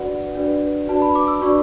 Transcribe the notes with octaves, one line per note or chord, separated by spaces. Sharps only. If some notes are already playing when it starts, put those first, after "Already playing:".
Already playing: D4 F#4 B4 D5 F#5
D4 F#4 B4 D5
D4 F#4 B4 D5 A5
B5
D6
E6
D4 F#4 B4 D5 C#6